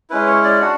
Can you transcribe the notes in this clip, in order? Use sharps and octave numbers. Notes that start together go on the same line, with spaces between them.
G#3 C#4 E4 B4
C#5
D5
D4 F#4 F#5